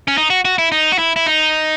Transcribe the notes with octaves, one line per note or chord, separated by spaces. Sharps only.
C#4
D#4
F#4
F#4
E4
D#4
F#4
E4
E4
D#4